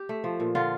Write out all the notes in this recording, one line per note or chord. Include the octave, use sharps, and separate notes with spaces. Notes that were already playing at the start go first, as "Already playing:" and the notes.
Already playing: G4
A3
F3
A#2
D3 F4